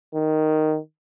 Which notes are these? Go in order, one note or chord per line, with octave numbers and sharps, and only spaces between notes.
D#3